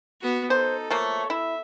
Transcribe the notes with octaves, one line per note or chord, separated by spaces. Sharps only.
B3 F#4
D#4 A4 C5
F3 A3 A#3 C#5
E4 E5